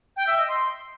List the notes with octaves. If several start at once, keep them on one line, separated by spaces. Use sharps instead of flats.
G5
E5
D#5
C6